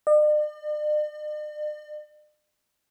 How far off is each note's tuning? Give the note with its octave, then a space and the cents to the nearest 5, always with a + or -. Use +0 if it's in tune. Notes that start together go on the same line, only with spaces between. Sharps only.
D5 +45